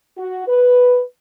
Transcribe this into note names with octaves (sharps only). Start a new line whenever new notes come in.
F#4
B4